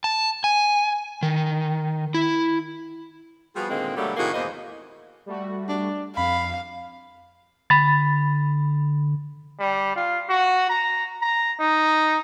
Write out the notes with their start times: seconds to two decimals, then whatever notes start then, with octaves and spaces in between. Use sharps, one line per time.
0.04 A5
0.44 G#5
1.23 D#3
2.14 E4
3.55 F3 G3 B3 F4 F#4 G#4
3.69 A#2 D3 D#3 G#3 A#3 C4
3.96 B2 D3 F#3 G3 A3 A#3
4.17 A2 C3 D#3 A#3 F#4 G#4
4.34 E2 B2 G#3 A#3 C5 D#5
5.26 G3 A3 F#4
5.68 D4
6.17 F2 F5 B5
7.70 D3 B5 A6
9.60 G3
9.96 F4
10.30 F#4
10.70 A#5
11.22 A#5
11.60 D#4